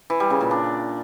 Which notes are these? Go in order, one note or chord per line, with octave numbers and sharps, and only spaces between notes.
E3
G3
C#3
A#2
D4